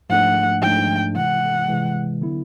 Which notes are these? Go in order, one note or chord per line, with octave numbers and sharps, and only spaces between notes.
G#2 F3 A3 D4 F#5
G#2 F3 A3 D4 G5
C3 E3 G#3 F#5
C3 E3 G#3
D3 F#3 B3 E4